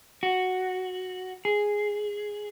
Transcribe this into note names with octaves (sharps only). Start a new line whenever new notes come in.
F#4
G#4